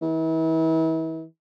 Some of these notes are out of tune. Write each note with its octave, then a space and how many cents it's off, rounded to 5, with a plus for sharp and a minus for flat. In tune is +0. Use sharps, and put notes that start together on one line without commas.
E3 -40